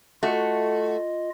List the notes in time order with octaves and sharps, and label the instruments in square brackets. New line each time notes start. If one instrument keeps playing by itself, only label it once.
[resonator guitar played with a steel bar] A3 F#4 [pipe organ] F4 D#5